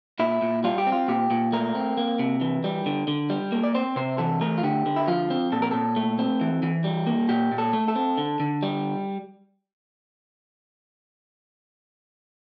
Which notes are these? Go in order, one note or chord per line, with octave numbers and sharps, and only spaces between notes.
A#2 E4
A#2
G3 F4
G4
C4
F4
A#2 G4
A#2
A3 A#4
C4
A#3
C3
E3
G3
D3
D3
G3
A#3
D5
C4 C5
C3 C5
E3 A4
A3 A#4
F4
D3 G4
D3
E4
F3 F4
C4
A#2 A4
A#4
A#2 A4
A3
C4
E3
E3
G3
A#3
A#2 G4
A#2
A4
A3
A4
C4
D3
D3
G3